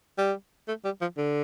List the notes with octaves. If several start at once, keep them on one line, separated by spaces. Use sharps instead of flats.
G3
A3
G3
F3
D3